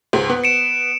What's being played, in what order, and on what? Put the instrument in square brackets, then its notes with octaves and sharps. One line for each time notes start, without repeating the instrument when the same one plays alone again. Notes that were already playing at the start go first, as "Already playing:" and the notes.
[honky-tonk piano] C#2 G#2 G#4
B3
[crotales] C#7 D7 E7